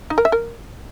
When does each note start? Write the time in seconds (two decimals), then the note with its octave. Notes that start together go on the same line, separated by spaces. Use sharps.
0.10 D#4
0.18 A#4
0.25 E5
0.32 A#4